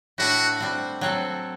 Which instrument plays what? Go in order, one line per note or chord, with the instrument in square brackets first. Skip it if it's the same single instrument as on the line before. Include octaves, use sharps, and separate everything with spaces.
[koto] A2 A3 D4 [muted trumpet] F#4
[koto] G3 C4 F#4
F#3 C4 F#4 A4